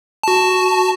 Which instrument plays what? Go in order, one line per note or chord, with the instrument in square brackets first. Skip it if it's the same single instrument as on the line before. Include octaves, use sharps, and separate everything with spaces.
[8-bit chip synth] F#4 A5